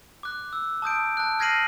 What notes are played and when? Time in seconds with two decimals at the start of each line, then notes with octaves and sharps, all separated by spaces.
0.23 D6 F#6
0.53 E6
0.82 A5 D#6 G6 D7
1.17 A5 F#6
1.39 F6 G#6 A#6 C7 D#7 F#7